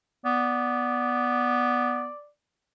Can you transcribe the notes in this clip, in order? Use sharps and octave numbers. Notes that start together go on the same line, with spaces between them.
B3 D5